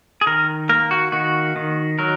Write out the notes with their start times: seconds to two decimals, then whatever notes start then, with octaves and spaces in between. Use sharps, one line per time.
0.21 G#4
0.26 D#3 A#4
0.69 A#3 A#4
0.91 F#4
1.12 D#3 F#4
1.56 D#3
1.99 F#3 A#4